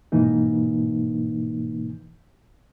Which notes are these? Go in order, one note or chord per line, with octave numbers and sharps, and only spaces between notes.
G#2 B2 E3 A#3 D#4